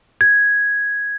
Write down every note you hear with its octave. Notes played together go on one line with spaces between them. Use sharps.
G#6